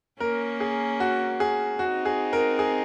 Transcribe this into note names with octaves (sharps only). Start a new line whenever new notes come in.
A#3 C#4 A#4
G#4
F#4
G#4
C4 D#4 F#4
G#4
A#4
G#4